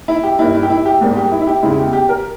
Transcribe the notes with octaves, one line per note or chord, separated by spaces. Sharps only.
E4
G4
G2 G3 A#3 E4
E4
G4
E4
G4
G#2 G3 A#3
G4
E4
E4
G4
E2 C#3 G#3 E4
G4
G4
A#4